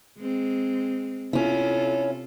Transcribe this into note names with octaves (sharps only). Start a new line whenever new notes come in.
G#3 C4
C3 C#4 E4 F4 A4